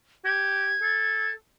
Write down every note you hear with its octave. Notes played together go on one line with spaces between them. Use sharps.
G4 G#6
A4